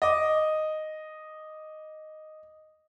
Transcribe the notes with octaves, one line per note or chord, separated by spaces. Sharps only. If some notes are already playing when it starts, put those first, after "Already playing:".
D#5 D6